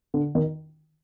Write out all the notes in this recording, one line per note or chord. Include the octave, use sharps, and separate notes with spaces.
D3
D#3